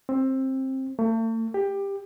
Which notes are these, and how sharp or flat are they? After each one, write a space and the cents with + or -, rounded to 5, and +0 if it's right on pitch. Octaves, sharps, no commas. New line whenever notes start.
C4 +20
A3 +45
G4 +15